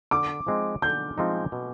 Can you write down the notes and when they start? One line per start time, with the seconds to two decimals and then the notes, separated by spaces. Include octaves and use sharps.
0.11 D3 D6
0.47 F3 G#3 C4 D#4
0.82 D3 G6
1.18 F3 G#3 C4 D#4
1.52 B2